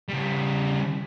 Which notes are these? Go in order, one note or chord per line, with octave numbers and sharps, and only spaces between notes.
C#3 G3